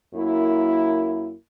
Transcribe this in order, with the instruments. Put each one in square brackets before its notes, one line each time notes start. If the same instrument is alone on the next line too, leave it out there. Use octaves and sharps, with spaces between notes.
[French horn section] F#2 A#3 E4